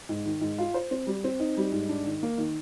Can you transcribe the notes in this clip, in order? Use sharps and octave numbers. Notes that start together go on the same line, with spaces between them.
G#2
D#3
G#2
F4
C5
C4
G3
C4
D#4
G3
G#2
D4
D#3
A#3
D#3